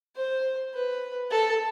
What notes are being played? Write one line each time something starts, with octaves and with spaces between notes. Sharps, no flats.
C5
B4
A4